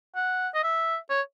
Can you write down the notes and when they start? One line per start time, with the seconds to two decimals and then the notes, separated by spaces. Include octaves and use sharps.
0.16 F#5
0.55 D#5
0.64 E5
1.10 C#5